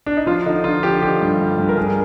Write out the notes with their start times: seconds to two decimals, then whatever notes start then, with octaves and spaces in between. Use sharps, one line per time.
0.06 D4
0.17 D#4
0.26 F3 F4
0.46 D3 D#4
0.64 D3 F4
0.83 F3 G4
1.02 D3 G4
1.21 G2
1.39 G2
1.58 G2
1.69 A#4
1.77 G2 G#4